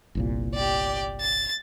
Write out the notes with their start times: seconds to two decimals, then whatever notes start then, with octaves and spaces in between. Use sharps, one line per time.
0.15 G1 C2 A#2
0.55 G4 D5
1.21 A6